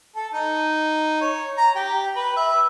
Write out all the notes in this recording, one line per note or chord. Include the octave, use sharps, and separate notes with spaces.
A4
D#4
C#5
A#5
G4
B4
E5